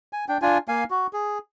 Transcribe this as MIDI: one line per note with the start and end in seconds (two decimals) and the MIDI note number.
0.13 0.25 80
0.29 0.38 62
0.29 0.38 79
0.42 0.58 62
0.42 0.58 65
0.42 0.58 80
0.68 0.84 58
0.68 0.84 77
0.68 0.84 80
0.91 1.07 66
1.13 1.38 68